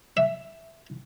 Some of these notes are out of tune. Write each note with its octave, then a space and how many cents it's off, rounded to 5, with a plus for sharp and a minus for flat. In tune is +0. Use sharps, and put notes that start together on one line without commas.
E5 +5